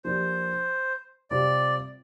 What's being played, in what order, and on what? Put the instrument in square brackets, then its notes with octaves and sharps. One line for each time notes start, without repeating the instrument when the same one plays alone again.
[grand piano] F3 A#3 D4 G4 [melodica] C5
[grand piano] C3 G3 C4 F4 [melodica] D5